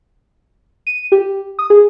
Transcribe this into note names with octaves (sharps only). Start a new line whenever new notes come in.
D#7
G4
D#6
G#4